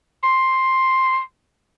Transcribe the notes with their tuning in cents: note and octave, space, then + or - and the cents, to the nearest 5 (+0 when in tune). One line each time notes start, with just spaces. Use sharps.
C6 +5